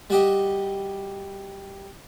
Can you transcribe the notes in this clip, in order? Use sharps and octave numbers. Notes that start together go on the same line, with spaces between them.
G3 F#4 G4 D#5